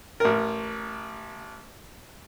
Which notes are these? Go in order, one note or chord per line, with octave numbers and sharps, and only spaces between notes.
A1 A#4